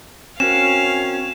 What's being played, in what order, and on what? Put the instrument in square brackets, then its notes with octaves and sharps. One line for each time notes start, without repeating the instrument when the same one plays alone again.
[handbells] C4 F#4 A#4 [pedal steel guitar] C#4 [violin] F5 [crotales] E7